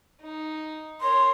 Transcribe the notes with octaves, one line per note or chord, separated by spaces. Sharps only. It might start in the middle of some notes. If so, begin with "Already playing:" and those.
D#4
A#4 C#5 C6